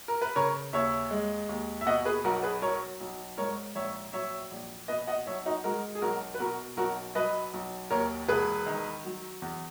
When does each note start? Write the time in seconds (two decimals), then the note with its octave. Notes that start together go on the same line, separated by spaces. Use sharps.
0.08 A#4
0.22 B4
0.36 C#3 A#4 C#5
0.73 D#2 C#5 E5
1.11 G#3
1.49 D#2
1.81 E5
1.86 B2 D#5 F#5
2.05 G#4 B4
2.24 B1 F#4 A#4
2.43 G#4 B4
2.62 F#3 A#4 C#5
3.01 B1
3.38 G#2 A#4 C#5
3.75 A#1 C#5 E5
4.13 F#3 C#5 E5
4.51 A#1
4.88 B2 B4 D#5
5.07 D#5 F#5
5.26 B1 C#5 E5
5.46 D#4 F#4
5.64 G#3 F#4 A#4
5.95 G#4
6.02 B1 F#4 A#4
6.35 B4
6.40 B2 F#4 A#4
6.77 B1 F#4 A#4
7.15 F#3 B4 D#5
7.54 B1
7.90 D#2 A#4 C#5
8.28 E1 G#4 B4
8.66 D#3
9.04 F#3
9.42 E2